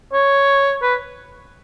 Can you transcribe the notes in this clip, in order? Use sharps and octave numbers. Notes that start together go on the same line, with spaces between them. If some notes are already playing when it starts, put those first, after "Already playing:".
C#5
B4